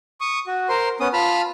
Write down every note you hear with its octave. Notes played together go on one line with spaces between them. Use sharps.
C#6 D#6
F#4
A#4 C5 C6
B3 C#4 D#6
F4 A5 B5 F6